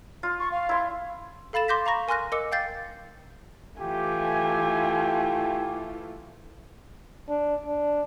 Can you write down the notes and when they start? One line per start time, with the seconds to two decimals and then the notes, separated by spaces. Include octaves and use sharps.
0.23 F4
0.39 C#6
0.51 F5
0.69 E4 C6
1.53 A4 F5 B5 A6 E7
1.68 C6 D6 G6 A#6 B6
1.86 F5 A#5 B5 C#6 A#6
2.08 A#4 G#5 C6 F6 F#6 A#6
2.32 A#4 D#5 D6 E6 C#7
2.52 F5 G5 G6 A6 C7
3.81 E3 A3 F4 G4 G#5
7.29 D4
7.66 D4